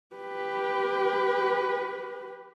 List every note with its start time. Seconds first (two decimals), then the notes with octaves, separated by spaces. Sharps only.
0.16 G4 B4